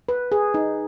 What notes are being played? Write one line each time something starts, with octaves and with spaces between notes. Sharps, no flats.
B4
G#4
D#4